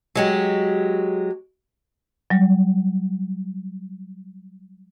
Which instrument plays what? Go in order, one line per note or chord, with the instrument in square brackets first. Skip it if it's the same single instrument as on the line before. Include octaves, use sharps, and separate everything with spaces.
[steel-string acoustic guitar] F#3 G#3 G4
[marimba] F#3 G3